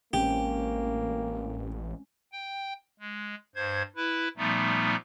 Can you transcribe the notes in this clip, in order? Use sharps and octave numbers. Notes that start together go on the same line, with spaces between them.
A1 G#3 A#3 C4 C#4 G4
G5
G#3
G2 C5 G#6
E4 B4
A#2 F3 G3 A3 B3 D#4